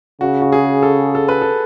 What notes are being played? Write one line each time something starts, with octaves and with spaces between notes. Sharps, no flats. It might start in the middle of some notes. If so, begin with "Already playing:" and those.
C#3 F#4
F#4
G#4
A4
A4
B4
A4